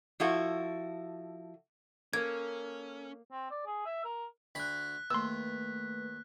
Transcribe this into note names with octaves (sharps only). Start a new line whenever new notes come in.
F3 E4 F#4 A4
A#3 C#4 A4 A#4 G#6
C4
D5
G#4
E5
A#4
D2 B5 F#6 B6
D#2 A3 B4 C6 E6